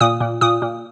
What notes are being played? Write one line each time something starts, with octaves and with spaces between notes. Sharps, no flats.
A#2 D#6
A#2
A#2 D#6
A#2